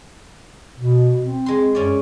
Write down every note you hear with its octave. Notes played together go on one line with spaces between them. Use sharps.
B2
C4
G#3 C6
F#2 C#4 D5